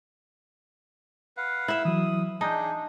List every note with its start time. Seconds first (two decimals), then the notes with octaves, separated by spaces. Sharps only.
1.37 B4 F5 F#5
1.68 E4 E5
1.85 E3 F#3 D#6
2.41 D4 D#4 G#4 A5 G6